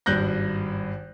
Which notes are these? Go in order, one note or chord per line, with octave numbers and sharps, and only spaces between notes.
G#1 G2 F#6 G6 A#6